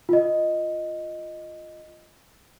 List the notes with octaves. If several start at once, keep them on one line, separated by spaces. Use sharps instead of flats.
F4 D#5